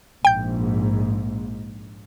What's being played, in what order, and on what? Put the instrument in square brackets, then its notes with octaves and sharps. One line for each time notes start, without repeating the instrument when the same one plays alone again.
[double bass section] A#1 G#2 [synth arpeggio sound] G5 G6